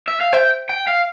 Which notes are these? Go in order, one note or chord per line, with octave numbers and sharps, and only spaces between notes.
E5
F5
C5 E5 G5
G5
F5